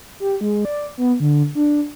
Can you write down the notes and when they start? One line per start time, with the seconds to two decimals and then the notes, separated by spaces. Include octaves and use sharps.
0.20 G4
0.41 G#3
0.65 D5
0.98 B3
1.20 D3
1.55 D4